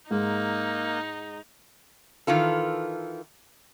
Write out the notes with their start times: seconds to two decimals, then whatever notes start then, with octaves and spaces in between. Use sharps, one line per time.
0.11 G#2 A#3 D#4
2.27 D#3 E3 F4 A4